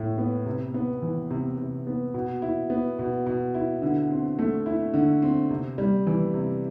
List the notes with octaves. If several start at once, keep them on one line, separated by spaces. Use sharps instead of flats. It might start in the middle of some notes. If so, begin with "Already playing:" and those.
Already playing: A2 E4
B3
C3
B3
E3
C3
C3
B3
B2
E4
B3
B2
B2
E4
D3
C4
A3
E4
D3
C4
C3
G3
E3
C3